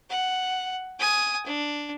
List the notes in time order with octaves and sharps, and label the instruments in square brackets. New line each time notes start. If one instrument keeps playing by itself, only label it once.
[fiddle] F#5
G#5 D#6
D4